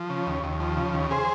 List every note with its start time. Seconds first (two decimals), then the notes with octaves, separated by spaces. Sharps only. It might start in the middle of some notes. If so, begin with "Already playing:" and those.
Already playing: F3
0.10 C#3
0.27 D#2
0.44 D#2
0.60 F3
0.77 C#3
0.94 D#2
1.11 G#4 C5